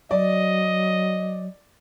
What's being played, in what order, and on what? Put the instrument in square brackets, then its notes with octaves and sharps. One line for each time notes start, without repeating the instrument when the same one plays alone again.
[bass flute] F#3 [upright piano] D5 [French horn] D#5